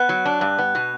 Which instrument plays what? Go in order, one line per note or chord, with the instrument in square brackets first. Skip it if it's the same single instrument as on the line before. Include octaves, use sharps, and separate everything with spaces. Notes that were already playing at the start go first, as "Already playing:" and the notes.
Already playing: [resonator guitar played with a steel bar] B3 [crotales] F#6
[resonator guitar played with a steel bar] F#3
D4
G2
B3
B2